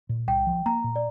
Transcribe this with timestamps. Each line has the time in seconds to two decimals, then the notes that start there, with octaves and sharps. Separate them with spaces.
0.09 A#2
0.27 C2 G5
0.47 F3
0.66 A#3 A#5
0.84 A#2
0.96 D5